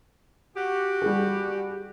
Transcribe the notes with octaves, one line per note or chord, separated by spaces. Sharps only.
F#4 G4
G3 G#4